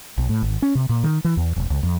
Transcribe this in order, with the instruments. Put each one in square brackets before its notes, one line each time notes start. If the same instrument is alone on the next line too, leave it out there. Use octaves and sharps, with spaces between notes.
[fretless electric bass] B1
A2
G#1
C#4
C3
A#2
D#3
E3
E2
E1
C#2
F2